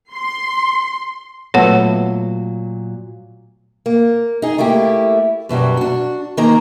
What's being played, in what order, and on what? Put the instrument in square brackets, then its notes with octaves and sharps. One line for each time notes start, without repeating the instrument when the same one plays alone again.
[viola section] C6
[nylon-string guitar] A#2 F#3 F4 [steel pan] A3 B3 A4 [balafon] C#5 F#5
[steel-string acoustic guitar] A#3
D#4 G#4
A3 A#3 E4 G4
F#2 B2 F#3 G3
D4 F#4
D#3 A#3 D#4 G#4 A#5